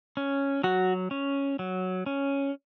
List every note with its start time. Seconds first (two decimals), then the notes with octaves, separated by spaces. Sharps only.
0.17 C#4
0.63 F#3 F#4
1.11 C#4
1.59 F#3
2.06 C#4